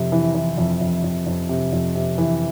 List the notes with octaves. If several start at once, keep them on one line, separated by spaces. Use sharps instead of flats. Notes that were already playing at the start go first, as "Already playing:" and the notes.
Already playing: F2 C3
E3
E3
F2
F2
F2
F2
C3
F2
C3
E3